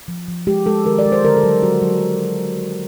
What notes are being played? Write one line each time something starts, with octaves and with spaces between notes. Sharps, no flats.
F3
F3
G#3 G4
G#3 A4
D#3 A#4
D5
G#3
C5
D3 A#4
A4
F#3
F#3 F#4
F#3